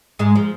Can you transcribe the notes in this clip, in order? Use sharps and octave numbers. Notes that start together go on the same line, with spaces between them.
G#2 G#3
F3